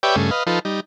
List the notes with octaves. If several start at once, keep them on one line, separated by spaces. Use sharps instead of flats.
G4 B4 C#5 D5 E5 G5
G2 C#3 A3 G#4
B4 D#5 F5
F3 D#4 F4 A4 B4
G3 D#4